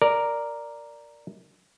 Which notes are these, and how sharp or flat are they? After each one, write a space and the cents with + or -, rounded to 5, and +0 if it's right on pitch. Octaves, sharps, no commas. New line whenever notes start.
A#4 +0 D5 +0